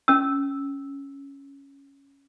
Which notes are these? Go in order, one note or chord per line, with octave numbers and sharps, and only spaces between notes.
C#4 E6